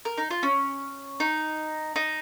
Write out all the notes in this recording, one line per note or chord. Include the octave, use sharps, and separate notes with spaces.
A#4
D#4
F4
C#4
D#4
D#4